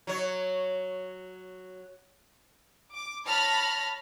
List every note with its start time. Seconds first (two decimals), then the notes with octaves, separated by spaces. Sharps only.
0.07 F#3 C#5
2.92 D6
3.27 C#5 A5 B5 F6 A#6